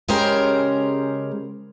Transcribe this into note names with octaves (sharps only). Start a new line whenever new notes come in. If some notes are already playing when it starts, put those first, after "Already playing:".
C#3 G#3 C#4 G4 A#4 C5